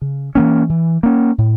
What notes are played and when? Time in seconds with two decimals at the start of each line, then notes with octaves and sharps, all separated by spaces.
0.02 C#3
0.35 E3 A#3 C#4
0.69 E3
1.03 A#3 C#4
1.38 A2